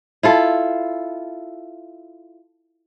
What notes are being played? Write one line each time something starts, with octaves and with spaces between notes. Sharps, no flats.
E4 F4 A4